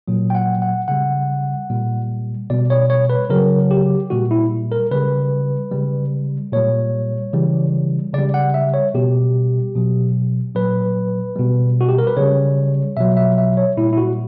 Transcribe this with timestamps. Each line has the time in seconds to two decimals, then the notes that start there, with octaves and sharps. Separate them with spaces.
0.08 A#2 F#3
0.30 G5
0.35 F#5
0.62 F#5
0.88 C#3 G3 F#5
1.70 A#2 G3
2.50 B2 G3 D5
2.70 C#5
2.90 C#5
3.10 B4
3.30 C#3 F#3 A#4
3.71 G4
4.10 A#2 G3 F#4
4.31 E4
4.72 A#4
4.91 C#3 G3 B4
5.72 C#3 G3
6.52 A#2 G3 C#5
7.33 C#3 E3 G3
8.14 C#3 G3 D5
8.34 F#5
8.54 E5
8.74 C#5
8.94 B2 G3 G4
9.75 B2 F#3
10.55 A#2 F#3 B4
11.36 B2 G3
11.81 F#4
11.89 G4
11.98 A#4
12.07 B4
12.17 C#3 G3 C#5
12.97 B2 F#3 E5
13.17 E5
13.38 E5
13.57 C#5
13.77 A#2 G3 E4
13.93 E4
13.98 F#4